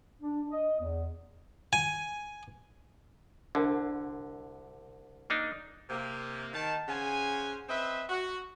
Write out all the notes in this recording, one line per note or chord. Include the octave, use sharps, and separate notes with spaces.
D4
D#5
E2
G#5
C2 D3 D4 A#4
A#3 D4 D#4
C3 A#3
D#3 A5
C#3 C5 F#5 G#5
C4 B4 D#5 E5
F#4